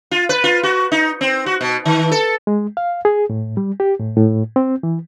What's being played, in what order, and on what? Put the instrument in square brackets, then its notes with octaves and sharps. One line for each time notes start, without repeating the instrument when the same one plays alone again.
[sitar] F4
B4
F4
F#4
D#4
C4
F#4
B2
D#3
A4
[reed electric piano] G#3
F5
G#4
A2
G3
G4
A2
A2
C4
E3